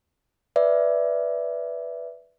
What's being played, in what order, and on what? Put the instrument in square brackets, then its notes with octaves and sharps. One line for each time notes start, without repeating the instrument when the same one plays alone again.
[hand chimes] B4 D5 E5